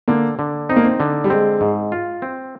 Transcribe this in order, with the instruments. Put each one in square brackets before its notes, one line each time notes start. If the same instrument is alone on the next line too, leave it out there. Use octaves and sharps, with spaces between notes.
[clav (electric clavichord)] D3 [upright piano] A#3
[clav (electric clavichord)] D3
[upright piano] C4 [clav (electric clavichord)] D#4
[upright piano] A#3
C4
[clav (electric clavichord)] D3
[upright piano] G3
[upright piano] G#3 [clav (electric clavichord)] C4
[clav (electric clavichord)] G#2
F4
C4